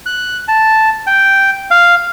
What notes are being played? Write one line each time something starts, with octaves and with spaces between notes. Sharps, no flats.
F#6
A5
G5
F5